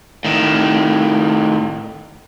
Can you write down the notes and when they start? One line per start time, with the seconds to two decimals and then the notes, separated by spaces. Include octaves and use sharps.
0.25 A2 D#3